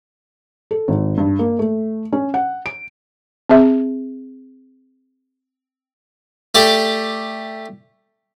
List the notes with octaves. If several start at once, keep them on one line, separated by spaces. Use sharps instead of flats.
A4
G#1
G2
A#3
A3
C#4
F#5
D7
C4 G#4 E5
A3 G4 D5